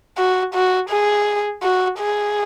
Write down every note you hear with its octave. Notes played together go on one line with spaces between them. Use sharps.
F#4
F#4
G#4
F#4
G#4